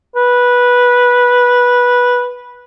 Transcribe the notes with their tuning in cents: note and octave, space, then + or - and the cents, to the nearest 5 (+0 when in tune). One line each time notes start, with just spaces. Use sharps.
B4 -10